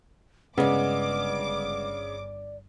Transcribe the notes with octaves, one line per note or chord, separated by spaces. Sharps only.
G1 C#3 G#3 B3 D5 D6